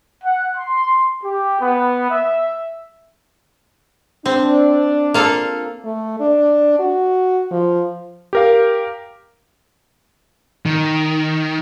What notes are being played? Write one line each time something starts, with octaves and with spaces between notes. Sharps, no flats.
F#5
C6
G4
B3
E5
C4 D4
A#3 F4 A4
A3
D4
F#4
F3
G4 A#4 F5
D#3